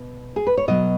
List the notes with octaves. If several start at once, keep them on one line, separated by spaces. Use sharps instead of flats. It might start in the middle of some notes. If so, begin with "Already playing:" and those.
Already playing: B2
G#4
B4
C#5
B2 F#3 D#5